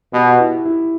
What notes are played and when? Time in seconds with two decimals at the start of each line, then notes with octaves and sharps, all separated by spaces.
0.13 B2 G4
0.40 E4
0.65 E4